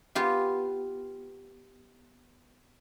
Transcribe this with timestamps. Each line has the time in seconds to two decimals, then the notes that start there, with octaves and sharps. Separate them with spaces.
0.15 B3 F4 G4